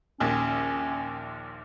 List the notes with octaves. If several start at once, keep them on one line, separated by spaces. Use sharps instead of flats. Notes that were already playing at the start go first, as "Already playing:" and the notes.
A#1 D#2 A#2 C#4